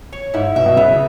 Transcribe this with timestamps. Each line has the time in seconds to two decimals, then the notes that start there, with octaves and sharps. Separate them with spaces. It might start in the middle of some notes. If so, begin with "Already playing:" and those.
0.13 C#5
0.34 G#2 E4
0.56 B2 E5
0.66 B2
0.76 C#3 B3